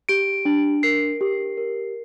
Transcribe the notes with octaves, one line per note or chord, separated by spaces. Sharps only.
G4 D7
D4
A#4 C7
G4
A#4